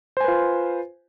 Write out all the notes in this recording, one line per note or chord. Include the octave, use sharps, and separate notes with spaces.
F4 B4 C5 G#5